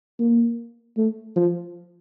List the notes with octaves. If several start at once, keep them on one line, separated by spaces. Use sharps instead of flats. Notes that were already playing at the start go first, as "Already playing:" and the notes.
A#3
A3
F3